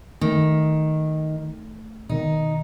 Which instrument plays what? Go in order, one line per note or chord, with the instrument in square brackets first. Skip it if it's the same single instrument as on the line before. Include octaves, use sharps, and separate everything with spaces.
[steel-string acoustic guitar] D#3 [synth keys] A3
[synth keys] B2 D#3 [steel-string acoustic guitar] D#4